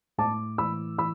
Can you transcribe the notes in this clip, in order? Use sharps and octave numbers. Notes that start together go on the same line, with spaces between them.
A2 A5 D6
E3 B5 E6
E3 B5 E6